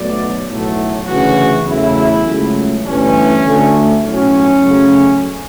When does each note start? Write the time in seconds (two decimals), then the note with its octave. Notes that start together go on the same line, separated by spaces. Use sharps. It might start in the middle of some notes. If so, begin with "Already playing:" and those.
Already playing: B1 B2 F#3 A3 D5
0.47 B1 A2 F#3 A3
1.05 D2 C#3 E3 F#4
1.64 E2 C#3 F#3 A3 E4
2.24 C#2 C#3 F#3 A3
2.84 G1 G2 E3 A3 C#4
3.44 D2 D3 A3
4.02 B1 A2 F#3 C#4
4.62 F#2 C#3 F#3 A3